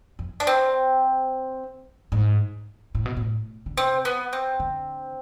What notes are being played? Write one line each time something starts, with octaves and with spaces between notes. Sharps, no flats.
F2
D4
C4
G#2
A2
B2
A2
D3
C3 C4
B3
C4
D3